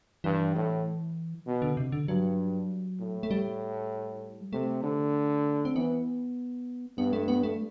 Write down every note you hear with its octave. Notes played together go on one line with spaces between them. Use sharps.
G2 E3
A2
B2
D3
C3
D3
G2 F#3
A2
A3
G3
C3 A3
D3
C4
E3 B3
G2 B3
A3
B3
A3